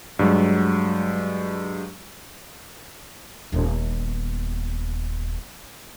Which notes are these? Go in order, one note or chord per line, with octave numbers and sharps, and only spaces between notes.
G2 F#3 G#3
D#1 B3